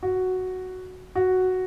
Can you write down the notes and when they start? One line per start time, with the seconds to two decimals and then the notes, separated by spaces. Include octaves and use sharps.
0.03 F#4
1.15 F#4